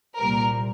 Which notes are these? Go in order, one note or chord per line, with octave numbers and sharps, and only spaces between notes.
C2 A#2 G3 A#4